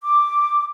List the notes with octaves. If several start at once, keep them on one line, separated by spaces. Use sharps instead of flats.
D6